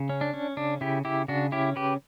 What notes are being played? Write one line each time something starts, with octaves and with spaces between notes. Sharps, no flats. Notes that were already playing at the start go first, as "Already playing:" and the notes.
Already playing: C#3
C#4
D4
C#4
C#3 D4
C#3 E4 G4
C#3 E4 G4
C#3 D4 F#4
C#4 E4 G4
C#3 G4 B4